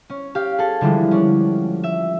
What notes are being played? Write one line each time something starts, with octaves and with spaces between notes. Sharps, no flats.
C#4
G4 F5
G#4 A4
D3 E3 F3 G3 G#3
C#4 D4
E5